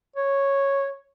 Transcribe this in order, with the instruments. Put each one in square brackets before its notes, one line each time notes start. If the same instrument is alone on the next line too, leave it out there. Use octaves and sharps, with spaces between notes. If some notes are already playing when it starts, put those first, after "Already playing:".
[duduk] C#5